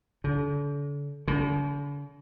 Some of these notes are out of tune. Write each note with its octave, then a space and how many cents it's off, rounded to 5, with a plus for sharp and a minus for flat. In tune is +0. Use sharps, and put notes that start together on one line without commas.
D3 -40
D3 -45